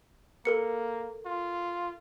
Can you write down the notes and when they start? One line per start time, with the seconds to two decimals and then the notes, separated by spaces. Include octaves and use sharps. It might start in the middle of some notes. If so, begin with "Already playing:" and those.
0.45 A#3 A4 A#4 C#7
1.26 F4